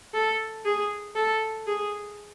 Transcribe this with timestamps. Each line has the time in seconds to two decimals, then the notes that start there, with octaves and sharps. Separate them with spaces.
0.14 A4
0.65 G#4
1.16 A4
1.67 G#4